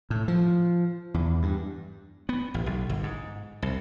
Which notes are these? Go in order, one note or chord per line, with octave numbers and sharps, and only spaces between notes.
A2
F3
E2
G2
B3
A1
B1
G1
G#2
C2